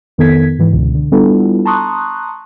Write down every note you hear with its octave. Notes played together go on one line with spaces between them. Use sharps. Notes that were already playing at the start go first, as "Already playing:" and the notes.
F2 D#3 B3 A4 G#6 B6
G#2 E3
C#2 B2 D3
D3
G3 B3 D4 E4 F4 A4
A5 A#5 C6 C#6 D#6 F#6